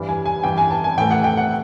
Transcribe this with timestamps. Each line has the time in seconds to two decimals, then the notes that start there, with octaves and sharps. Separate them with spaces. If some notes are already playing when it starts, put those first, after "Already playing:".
Already playing: G2 E3 G3
0.09 G#5
0.26 G#5
0.44 G2 E3 G3 G5
0.58 G#5
0.71 A5
0.84 G#5
0.97 A2 E3 A3 G5
1.11 F#5
1.24 G5
1.37 F#5